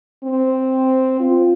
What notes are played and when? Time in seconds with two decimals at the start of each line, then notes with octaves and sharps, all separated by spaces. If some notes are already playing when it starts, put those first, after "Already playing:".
0.24 C4
1.20 F4